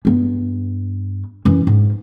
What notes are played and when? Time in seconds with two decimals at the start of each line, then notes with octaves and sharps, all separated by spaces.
0.05 G2 B3
1.45 F#2 E3
1.67 G#2